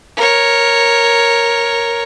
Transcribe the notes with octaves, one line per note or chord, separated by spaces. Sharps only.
A#4 C#5